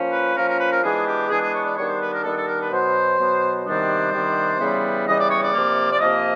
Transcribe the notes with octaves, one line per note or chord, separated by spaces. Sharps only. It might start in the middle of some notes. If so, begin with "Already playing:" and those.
Already playing: F3 A#3 C#4
B4
F3 A#3 C#4 A#4
A#4
B4
A#4
E3 G#3 B3 D4 G#4
G4
E3 G#3 B3 D4 G#4
G#4
C#5
D5
D#3 G3 B3 D4 C#5
C5
B4
A#4
D#3 G3 B3 D4 A4
A4
A#4
B4
B2 F#3 B3 C5
B2 F#3 B3
C3 D#3 G3 B3 D4 C5
C3 D#3 G3 B3 D4
C#3 E3 G3 B3
C#3 E3 G3 B3 D#5
D5
C#5
D5
C3 F3 A#3
D5
C3 F3 A#3 D#5